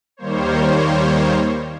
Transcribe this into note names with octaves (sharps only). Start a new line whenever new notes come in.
D#2 D#3 G3 A#3 C5 C#5